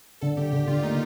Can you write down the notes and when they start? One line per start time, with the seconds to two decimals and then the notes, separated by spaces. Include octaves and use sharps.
0.21 D3 A4
0.37 D3 G4
0.52 D3 G4
0.67 D3 F4
0.83 A#3 D#4